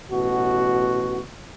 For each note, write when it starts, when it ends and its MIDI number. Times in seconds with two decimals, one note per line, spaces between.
0.11 1.21 33
0.11 1.21 47
0.11 1.21 66